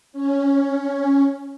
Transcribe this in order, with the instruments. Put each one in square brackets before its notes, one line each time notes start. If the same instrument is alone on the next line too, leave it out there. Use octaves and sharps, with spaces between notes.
[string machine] C#4